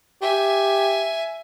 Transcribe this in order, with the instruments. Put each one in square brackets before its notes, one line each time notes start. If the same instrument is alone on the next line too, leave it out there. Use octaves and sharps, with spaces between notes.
[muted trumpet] G4 [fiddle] E5 G#5